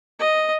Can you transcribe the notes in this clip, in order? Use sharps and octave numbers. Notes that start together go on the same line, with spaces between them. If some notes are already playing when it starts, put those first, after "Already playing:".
D#5